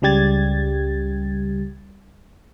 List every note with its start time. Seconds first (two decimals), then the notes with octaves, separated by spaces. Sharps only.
0.02 C#2 C#3 G3 G4 G#6 A6